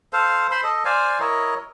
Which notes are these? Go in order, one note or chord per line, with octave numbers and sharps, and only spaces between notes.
A4 C5 F5
C5 B5 C6
A4 D#5
C5 D5 F5 G#5
E4 A#4 C#5 D#5